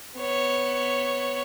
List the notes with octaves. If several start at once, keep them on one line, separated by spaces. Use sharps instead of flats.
B3 C#5